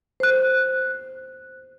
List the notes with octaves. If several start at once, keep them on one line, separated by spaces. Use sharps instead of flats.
C5 F#6